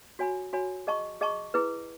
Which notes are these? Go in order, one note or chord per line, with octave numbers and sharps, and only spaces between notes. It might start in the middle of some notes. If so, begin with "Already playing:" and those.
F#4 C#5 G#5 B5
F#4 C#5 G#5 B5
G#4 D#5 A5 C#6
G#4 D#5 A5 C#6
E4 G#4 B4